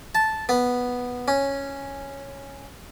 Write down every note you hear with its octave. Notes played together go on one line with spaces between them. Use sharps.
A5
B3
C#4